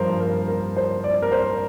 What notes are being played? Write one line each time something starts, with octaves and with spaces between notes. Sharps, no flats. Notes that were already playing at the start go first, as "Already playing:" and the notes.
Already playing: G2 F3 A#4 C5
A#4
A#4
C5
D5
A#4
C5